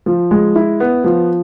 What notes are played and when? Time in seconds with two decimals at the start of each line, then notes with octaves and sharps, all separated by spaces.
0.06 F3
0.31 G#3
0.56 E4
0.80 B3
1.04 F3